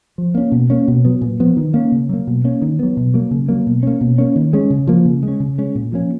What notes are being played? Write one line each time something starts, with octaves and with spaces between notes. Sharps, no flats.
F3
A#3 C#4
B2
A#3 C#4
B2
F#3 B3
A#2
F3 B3
D#3
A#3 C#4
C#3
F#3 A#3
B2
A#3 C#4
D#3
F#3 B3
B2
F#3 A#3
C#3
F#3 A#3
B2
A#3 C#4
B2
A#3 C#4
D#3
G#3 C#4
C#3
F3 A#3
C#3
G#3
C#4
C#3
G#3 C#4
A#2
F3 A#3 C#4